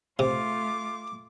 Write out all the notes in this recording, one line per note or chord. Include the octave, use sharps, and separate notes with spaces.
C3 A3 F4 D6